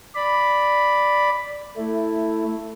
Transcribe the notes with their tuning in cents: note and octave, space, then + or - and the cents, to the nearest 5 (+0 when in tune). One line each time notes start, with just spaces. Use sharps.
D5 +0 B5 +0
A3 +10 E4 +0